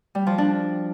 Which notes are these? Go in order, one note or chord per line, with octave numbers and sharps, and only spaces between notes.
G3
F3
D4